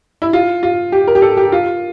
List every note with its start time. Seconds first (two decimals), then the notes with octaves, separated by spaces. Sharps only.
0.22 E4
0.33 F4
0.63 F4
0.92 G4
1.07 A#4
1.15 G4
1.22 A4
1.37 G4
1.52 F4